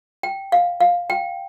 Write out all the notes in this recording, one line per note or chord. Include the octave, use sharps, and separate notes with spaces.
G5
F5
F5
G5